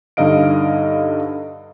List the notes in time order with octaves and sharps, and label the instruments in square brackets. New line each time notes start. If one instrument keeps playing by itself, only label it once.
[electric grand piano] G2 D3 D#4 D#5 F5 D7